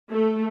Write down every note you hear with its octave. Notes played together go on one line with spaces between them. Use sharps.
A3